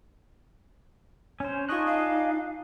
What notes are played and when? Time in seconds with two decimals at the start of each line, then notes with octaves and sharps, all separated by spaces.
1.40 C#4 C5 C#5
1.69 D4 D#4 F4 G#4 D#5 C#6 F#6
1.86 F5